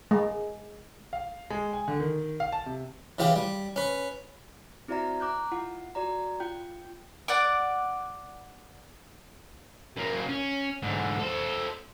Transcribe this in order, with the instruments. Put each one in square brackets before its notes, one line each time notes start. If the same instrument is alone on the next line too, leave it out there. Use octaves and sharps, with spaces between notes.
[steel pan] G#3
[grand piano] F5
G#3
G#5
D3
D#3
F5
A5
C3
[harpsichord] C#3 E3 F4 G4
G3
C#4 B4
[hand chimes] C4 E4 F#4 D5 E5 A#5
A#5 D6 F#6 G6
E4 F4 F#5
F#4 D5 A#5
F4 G5 G6
[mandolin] D5 F#5 D6
[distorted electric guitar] F#2 A#3
C#4
G#2 D3
A4 C5